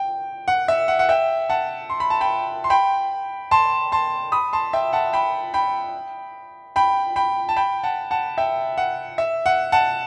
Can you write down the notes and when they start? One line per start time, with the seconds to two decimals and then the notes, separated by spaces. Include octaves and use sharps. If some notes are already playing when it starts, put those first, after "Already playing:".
Already playing: G5
0.48 F#5
0.68 E5
0.88 F#5
0.99 F#5
1.09 E5 G5
1.50 F#5 A5
1.90 C6
2.00 B5
2.10 A5
2.21 G5 B5
2.64 C6
2.70 G5 B5
3.51 A5 C6
3.92 A5 C6
4.32 B5 D#6
4.53 A5 C6
4.73 E5 G5
4.93 F#5 A5
5.13 G5 B5
5.54 G5 B5
6.76 G5 B5
7.16 G5 B5
7.49 A5
7.56 G5 B5
7.83 F#5 A5
8.11 F#5 A5
8.38 E5 G5
8.78 F#5
9.18 E5
9.46 F#5
9.72 F#5 A5